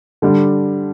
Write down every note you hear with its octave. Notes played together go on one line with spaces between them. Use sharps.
D3 G3 D4